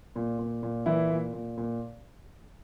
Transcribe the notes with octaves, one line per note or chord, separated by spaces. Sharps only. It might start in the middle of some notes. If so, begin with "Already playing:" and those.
A#2
A#2
A#2
A#2 E3 E4
A#2
A#2
A#2